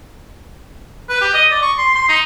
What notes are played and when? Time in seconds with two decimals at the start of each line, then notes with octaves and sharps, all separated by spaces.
1.09 B4
1.21 G4
1.34 D#5
1.51 D5
1.62 C#6
1.78 C6
1.95 C6
2.08 D#4